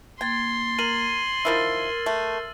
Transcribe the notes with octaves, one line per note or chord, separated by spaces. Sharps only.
A#3 G5 C6 G#6 A6
A#4 D#7 F#7
D#3 F3 E4 A#4 E6 F6 A6
A3